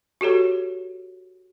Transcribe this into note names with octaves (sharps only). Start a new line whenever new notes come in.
F#4 G4 A4 C#5